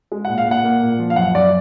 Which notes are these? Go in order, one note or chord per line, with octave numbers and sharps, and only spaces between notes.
G#3
F#5
A#2
F5
A#2 F#5
A#3
A#2
F3
F5
F#2 F#5
F#2 D5